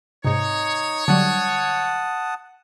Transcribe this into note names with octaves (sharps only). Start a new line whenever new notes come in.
G#2 C3 D#4 C#5
D3 F#3 G3 F#5 A5 D#6